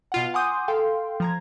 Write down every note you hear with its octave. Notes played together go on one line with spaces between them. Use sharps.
B2 F4 F#5
F#5 G#5 C6 D6 D#6 G6
A4 F5 G5 C6
F3 A#5 G#6